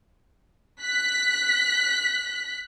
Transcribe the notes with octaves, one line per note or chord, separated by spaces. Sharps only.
F#6 B6